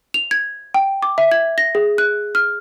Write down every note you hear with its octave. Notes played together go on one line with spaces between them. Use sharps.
F7
G#6
G5
D6
E5
G#6
A#6
G#4
F#6
F6